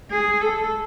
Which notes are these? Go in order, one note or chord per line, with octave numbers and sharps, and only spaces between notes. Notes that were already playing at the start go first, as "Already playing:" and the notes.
G#4
A4